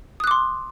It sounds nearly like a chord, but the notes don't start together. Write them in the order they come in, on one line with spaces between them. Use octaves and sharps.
D#6 F#6 D6 C6